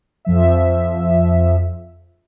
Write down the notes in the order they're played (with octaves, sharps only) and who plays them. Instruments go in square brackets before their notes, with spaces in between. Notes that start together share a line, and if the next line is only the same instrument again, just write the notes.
[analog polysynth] F2 F3 E5